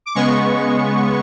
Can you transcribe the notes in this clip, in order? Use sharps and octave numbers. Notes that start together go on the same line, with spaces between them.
D6
C#3 G#3 B3 C#6